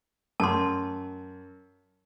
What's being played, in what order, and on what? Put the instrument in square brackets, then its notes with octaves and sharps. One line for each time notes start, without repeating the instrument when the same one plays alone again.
[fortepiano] F#2 [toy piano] A5 C6